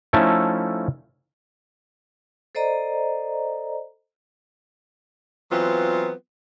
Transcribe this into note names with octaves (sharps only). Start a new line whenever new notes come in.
F3 A3 C#4 D#4 E4 A4
A4 C5 D5 D#5 A#5
E3 F#3 B3 C4 F4